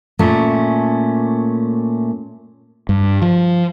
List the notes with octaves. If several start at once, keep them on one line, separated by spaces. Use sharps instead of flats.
A#2 A3 C#4
G2
F3